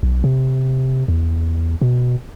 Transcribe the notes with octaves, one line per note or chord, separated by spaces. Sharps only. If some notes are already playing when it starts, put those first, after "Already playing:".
B1
C3
E2
B2